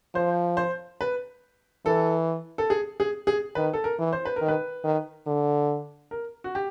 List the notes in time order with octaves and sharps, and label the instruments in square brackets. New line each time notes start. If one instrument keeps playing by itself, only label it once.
[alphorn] F3 [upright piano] C5
[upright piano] C5
B4
[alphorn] E3 [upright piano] A4
[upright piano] A4
G#4
G#4
G#4
[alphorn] D#3 [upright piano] B4
[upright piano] A4
A#4
[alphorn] E3
[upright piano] C5
B4
A#4
[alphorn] D#3
[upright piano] B4
[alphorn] D#3
D3
[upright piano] A#4
F#4
G4